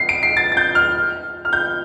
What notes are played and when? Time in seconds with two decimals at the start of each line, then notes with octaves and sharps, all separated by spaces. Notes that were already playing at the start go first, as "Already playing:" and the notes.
Already playing: C7
0.09 D7
0.23 C7
0.37 A6
0.52 A6
0.57 G6
0.75 F6
1.45 F6
1.53 G6